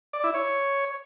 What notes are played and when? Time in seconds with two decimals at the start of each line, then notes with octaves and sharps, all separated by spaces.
0.13 D5
0.24 E4
0.34 C#5